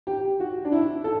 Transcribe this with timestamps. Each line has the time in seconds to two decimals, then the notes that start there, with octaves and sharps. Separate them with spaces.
0.07 G4
0.40 F#4
0.65 D4
0.72 E4
1.04 A4